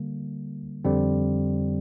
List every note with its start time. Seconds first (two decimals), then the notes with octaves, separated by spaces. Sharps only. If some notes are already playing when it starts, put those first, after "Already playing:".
Already playing: D3 G3 A#3
0.85 F2 D3 G3 C4